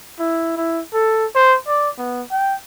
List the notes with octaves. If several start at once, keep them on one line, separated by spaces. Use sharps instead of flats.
E4
E4
A4
C5
D5
B3
G5